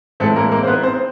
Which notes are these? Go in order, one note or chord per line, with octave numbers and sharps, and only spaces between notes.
A2 E3 G#3 A3 C4 A4
A#3 A#4
A#3 A#4
C5
B3 B4
C4 C5